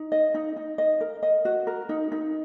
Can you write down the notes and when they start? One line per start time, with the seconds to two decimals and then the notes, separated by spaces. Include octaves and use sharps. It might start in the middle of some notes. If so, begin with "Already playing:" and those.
Already playing: D#4
0.12 D#5
0.34 D#4
0.56 D#4
0.78 D#5
1.01 A#4
1.23 D#5
1.45 F#4
1.67 A#4
1.89 D#4
2.12 D#4